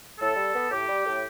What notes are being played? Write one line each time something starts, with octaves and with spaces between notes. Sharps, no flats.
A2 A4
G3
B3
A2 G4
G3
A2